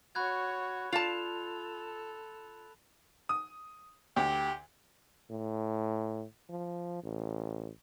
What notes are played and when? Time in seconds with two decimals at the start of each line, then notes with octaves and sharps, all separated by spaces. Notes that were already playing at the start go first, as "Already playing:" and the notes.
0.15 F#4 C#5 B5 F#6 G#6
0.93 F4 A4 D5 A5 F7
3.29 D#6
4.16 D2 G4
5.30 A2
6.49 F3
7.03 A1